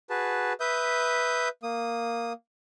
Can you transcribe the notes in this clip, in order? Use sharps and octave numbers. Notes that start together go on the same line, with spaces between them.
F#4 G#4 B4 A5
B4 E5 D#6 G6
A#3 D#6